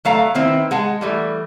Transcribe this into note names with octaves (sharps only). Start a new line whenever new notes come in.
F#3 A3 F5 A#5
D#3 B3 C4 E4
G#3 F#5 A5
E3 G3 A3